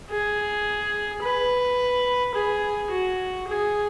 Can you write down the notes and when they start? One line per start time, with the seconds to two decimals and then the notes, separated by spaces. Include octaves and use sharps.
0.11 G#4
1.22 B4
2.34 G#4
2.91 F#4
3.47 G#4